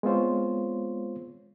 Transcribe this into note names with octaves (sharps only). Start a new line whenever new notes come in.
G#3 B3 C4 F4 C5 C#5